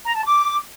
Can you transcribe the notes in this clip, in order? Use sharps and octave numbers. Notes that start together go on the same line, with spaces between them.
A#5
A5
D6